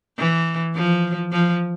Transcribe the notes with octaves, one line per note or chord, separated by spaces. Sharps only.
E3
F3
F3